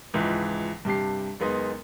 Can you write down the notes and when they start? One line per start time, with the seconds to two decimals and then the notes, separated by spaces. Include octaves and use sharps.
0.14 C#2 G#2 E3 F3
0.85 G2 C3 G4 A5 C7
1.40 F#1 G#3 B3 D#4 C6